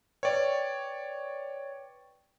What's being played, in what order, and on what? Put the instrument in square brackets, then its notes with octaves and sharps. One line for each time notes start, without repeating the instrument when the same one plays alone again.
[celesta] B4 G5 C#6 [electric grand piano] C#5 D5